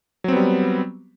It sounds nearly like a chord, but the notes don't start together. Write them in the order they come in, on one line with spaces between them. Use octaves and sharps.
F#3 C4 B3 G3